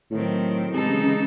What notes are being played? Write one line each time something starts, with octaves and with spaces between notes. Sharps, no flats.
A2 D#3 F#3 C4
C3 E3 G#3 D#4 A4
C#3
C#3